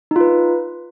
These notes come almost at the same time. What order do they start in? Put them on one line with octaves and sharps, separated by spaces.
D#4 F4 B4